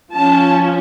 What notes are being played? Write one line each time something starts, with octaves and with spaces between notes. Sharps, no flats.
F3 C#4 A5